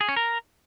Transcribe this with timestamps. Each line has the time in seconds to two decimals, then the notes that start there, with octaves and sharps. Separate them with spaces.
0.01 G#4
0.09 C#4
0.16 A#4